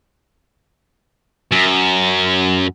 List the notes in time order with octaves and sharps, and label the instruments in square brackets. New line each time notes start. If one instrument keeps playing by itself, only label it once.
[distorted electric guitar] F#2